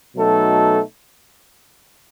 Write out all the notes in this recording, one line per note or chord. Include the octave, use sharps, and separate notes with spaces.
B2 F#3 A3 D#4 A4